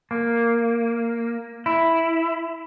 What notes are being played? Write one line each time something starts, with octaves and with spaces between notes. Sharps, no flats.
A#3
E4